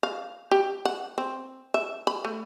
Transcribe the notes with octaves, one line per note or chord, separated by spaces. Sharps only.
F5
G4
F#5
C4
E5
B5
A3